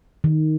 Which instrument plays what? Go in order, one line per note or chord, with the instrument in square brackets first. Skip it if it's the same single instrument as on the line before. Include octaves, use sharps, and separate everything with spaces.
[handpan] D#3